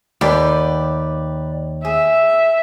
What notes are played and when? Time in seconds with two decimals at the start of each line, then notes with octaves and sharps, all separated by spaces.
0.21 D#2 G4 B4 D5
1.85 G#4 E5